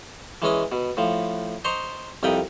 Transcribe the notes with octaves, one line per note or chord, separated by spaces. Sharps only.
E3 G#3 C#4 D#5
B2
A2 F3
C5 D#5 A#5 C6 C#6
C2 F2 A#4 G5 B5 D#6